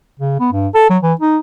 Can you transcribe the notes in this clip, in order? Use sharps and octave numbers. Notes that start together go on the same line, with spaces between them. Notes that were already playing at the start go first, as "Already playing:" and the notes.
C#3
B3
G2
A4
F#3
E3
D#4